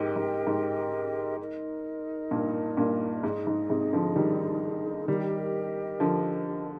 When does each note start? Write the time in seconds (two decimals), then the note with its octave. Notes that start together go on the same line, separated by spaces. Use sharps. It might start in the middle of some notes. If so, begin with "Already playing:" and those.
Already playing: G#2 G4 A#4 D#5 G5
0.16 G#2
0.47 G#2
1.39 D#4 A#4 D#5
2.31 G2 A#2
2.77 G2 A#2
3.23 G#2 D#4 G#4 D#5
3.47 G#2
3.70 G#2 C3
3.93 D3 F3
4.16 D#3 G3
5.08 D#3 G3 G4 A#4 D#5
6.00 D3 F3